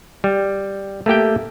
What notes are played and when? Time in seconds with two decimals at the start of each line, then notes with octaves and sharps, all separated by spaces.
0.24 G3
1.06 A3 A#3 G4 G5